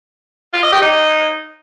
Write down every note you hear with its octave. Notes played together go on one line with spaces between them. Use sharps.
F4
D#5
G4
D#4